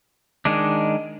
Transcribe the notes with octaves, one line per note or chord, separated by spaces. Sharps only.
D#3 G#3 D4